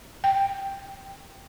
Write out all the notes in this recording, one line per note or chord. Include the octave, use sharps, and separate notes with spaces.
G5